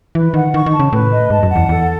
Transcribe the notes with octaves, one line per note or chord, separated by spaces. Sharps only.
E3 B4
D#3 F#5
D#3 C#6
D#3
A5
C#3
A2 B4
D#5
G#2 A5
F#2
F#5
E2
E2 A4